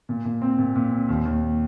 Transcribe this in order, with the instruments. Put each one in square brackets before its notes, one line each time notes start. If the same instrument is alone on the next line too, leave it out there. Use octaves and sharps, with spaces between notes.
[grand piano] A#2
A#2
C4
A#2
A#2
C4
D#2
D#2